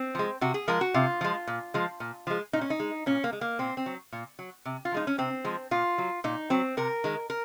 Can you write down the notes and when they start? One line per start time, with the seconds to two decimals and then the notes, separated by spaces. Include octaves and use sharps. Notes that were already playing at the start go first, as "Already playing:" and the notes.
Already playing: C4
0.15 F3 G#3
0.41 C3 F#4
0.54 G#4
0.68 F3 G#3 A#4
0.81 F#4
0.94 C3 F4
1.21 F3 G#3
1.47 A#2
1.74 F3 G#3
2.00 A#2
2.27 F3 G#3
2.53 A#2 D#4
2.61 C#4
2.70 D#4
2.80 G#3
3.06 A#2 C#4
3.24 A#3
3.33 G#3
3.41 A#3
3.59 A#2 C4
3.77 C4
3.86 F#3
4.12 A#2
4.39 F#3
4.65 C3
4.85 F4
4.92 F3 G#3 D#4
5.07 C#4
5.18 C3 C4
5.44 F3 G#3
5.71 A#2 F4
5.98 F#3
6.24 A#2 D#4
6.50 F#3 C4
6.77 C3 A#4
7.04 D#3 G#3
7.30 A#4